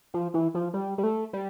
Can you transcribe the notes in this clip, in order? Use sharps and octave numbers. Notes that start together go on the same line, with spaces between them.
F3
E3
F3
G3
G3
A3
G3